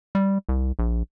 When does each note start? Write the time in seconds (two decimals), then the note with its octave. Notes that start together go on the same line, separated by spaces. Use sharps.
0.15 G3
0.49 C2
0.79 A#1